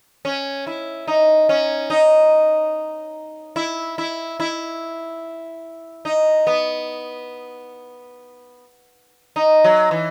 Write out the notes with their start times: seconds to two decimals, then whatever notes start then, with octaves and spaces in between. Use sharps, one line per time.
0.25 C#4
0.67 E4
1.08 D#4
1.49 C#4
1.90 D#4
3.56 E4
3.98 E4
4.40 E4
6.05 D#4
6.47 B3
9.36 D#4
9.64 F#3
9.91 E3